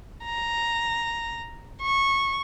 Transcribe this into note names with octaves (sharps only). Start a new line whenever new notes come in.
A#5
C#6